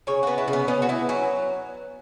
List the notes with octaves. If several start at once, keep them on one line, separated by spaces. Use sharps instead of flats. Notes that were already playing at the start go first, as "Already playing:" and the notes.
C#3 C#5
B3 F#4
E4
C#3
B3
B3 C#4
F#4
B3 E4
F#3 C#4